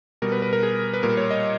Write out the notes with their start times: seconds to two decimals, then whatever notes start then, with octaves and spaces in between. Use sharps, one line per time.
0.22 B2 G3 A#4
0.32 B4
0.42 B4
0.53 A#4
0.63 G#4
0.94 B4
1.03 A#2 G3 A#4
1.17 C#5
1.31 D#5